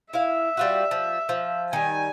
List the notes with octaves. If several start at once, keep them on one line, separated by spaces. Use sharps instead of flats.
E4 E5 F5
G3 F4 F#4
F3
F3
D#3 G3 G#5